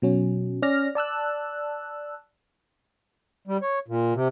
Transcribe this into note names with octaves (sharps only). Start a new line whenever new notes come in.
B2 F#3 C#4
C#4 D5 F6 A#6
D5 A5 E6 F#6
G3
C#5
A#2
C3